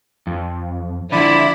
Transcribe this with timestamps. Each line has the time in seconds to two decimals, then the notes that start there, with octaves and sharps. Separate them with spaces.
0.27 F2
1.12 D3 F3 E4 D5 B5